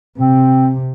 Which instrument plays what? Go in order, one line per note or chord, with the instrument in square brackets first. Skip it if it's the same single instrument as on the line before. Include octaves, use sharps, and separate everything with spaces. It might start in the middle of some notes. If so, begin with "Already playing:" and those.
[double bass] C3 [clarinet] C4